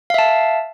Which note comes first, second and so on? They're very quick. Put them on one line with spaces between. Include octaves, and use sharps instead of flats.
F5 E5 A5